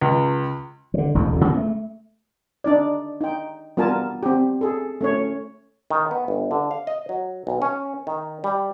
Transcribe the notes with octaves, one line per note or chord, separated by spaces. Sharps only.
C#2
D3 F3
E1 A1 D#2
F2 D3
C#3 B3
A3
D4 D#4 D5
D#4 G5
G3 B3 F4 A#4 G#5 A5
C4 G4
G#4 A4
A3 C#4 C#5
D#3
B3
G1
D3
F5
D#5
F#3
B1
C#4
D#3
G3